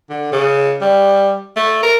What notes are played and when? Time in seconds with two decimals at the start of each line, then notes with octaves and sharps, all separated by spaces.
0.10 D3
0.32 C#3
0.81 G3
1.56 A3
1.83 A#4